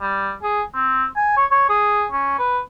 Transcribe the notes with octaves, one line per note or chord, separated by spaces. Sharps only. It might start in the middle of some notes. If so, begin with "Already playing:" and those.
G3
G#4
C4
G#5
C#5
C#5
G#4
C#4
B4